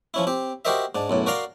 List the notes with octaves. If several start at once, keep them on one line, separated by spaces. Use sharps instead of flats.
F3 C#4 E4
C4 G4
F#4 G4 A#4 C5 D#5 E5
G#2 D4
B1 F#2 A2
F#4 A#4 D5 F5 A#5 C6